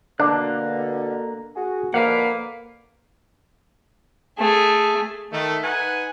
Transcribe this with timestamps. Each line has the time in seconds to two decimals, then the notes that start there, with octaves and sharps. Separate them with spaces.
0.20 B2 D3 A#3 D4 F#6
1.56 F#4 G#4
1.94 B2 D3 F3 A#3 B4 F5 F#5
4.39 A3 G#4
5.33 D#3 A3
5.63 D#4 B4 F#5 G#5